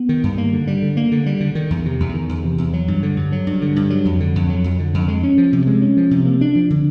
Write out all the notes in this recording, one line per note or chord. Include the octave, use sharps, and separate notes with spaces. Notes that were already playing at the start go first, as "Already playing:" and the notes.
Already playing: B3
D#3
G2
A#3
D3
G3
D3
A#3
D3
G3
D3
D#3
E2
C3
E2
D#3
E2
C3
E2
F#3
G2
D3
G2
F#3
G2
D3
G2
F#3
F2
D3
F2
F#3
F2
D3
F2
G#3
C#4
F3
C3
G#3
C#4
F3
C3
A#3
D4
F3
D3